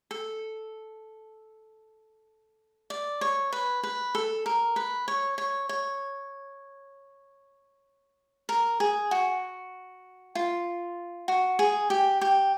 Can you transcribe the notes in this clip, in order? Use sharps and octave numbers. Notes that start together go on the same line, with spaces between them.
A4
D5
C#5
B4
B4
A4
A#4
B4
C#5
C#5
C#5
A#4
G#4
F#4
F4
F#4
G#4
G4
G4